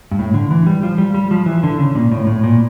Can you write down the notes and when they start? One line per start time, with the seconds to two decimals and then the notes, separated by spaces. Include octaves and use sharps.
0.11 G2
0.19 A2
0.34 D3
0.51 E3
0.66 G3
0.83 F3
0.98 G3
1.14 G3
1.31 F3
1.46 E3
1.63 D3
1.78 C#3
1.95 A#2
2.12 A2
2.27 A2
2.44 A#2